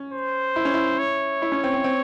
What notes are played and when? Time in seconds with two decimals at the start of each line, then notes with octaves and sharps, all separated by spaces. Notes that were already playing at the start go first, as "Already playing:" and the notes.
Already playing: C#4
0.13 C5
0.56 E4
0.65 C#4
0.74 E4
0.99 C#5
1.42 E4
1.52 C#4
1.64 C4
1.74 C4
1.84 C4